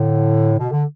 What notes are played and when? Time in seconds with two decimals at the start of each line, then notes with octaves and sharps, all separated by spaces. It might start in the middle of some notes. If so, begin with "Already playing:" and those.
Already playing: A2 D3
0.59 B2
0.71 D3